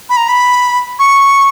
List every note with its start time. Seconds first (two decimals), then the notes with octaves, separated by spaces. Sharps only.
0.10 B5
0.17 A#5
0.28 B5
0.99 C#6